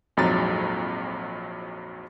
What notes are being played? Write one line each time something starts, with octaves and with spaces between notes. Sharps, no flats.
A#1 F2 G#2 F#3 A#5 A6